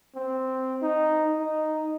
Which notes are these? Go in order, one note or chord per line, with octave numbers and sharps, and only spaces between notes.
C4
D#4
D#4